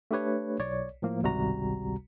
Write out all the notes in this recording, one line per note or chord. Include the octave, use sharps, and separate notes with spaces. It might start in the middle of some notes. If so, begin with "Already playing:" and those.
A3 D4 G4 B4 C#5
B1 C#5 D5
A2 F3 A#3
G#1 C#2 C3 G3 F#4 A#5